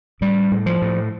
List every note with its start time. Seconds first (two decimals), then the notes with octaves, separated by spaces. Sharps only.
0.21 A2 G3
0.52 A2
0.66 F3
0.82 A2